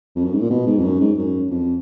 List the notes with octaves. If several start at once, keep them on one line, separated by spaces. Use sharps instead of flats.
F2
F#2
G#2
A#2
B2
G#2
F2
F#2
G#2
F#2
F2